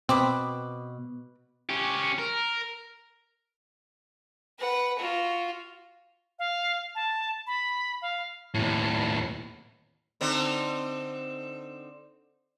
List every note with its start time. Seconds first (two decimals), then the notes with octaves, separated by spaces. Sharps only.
0.09 B2 C4 B4 D6 D#6
1.70 C#4 G4
2.18 A#4
4.59 B4 F#5
4.98 F4 F#4
6.39 F5
6.95 A5
7.47 B5
8.02 F5
8.54 D#2 A2
10.21 D3 C4 D#4